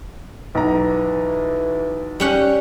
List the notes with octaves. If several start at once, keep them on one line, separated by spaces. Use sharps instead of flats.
B1 E3 A#5
G3 C#4 F#5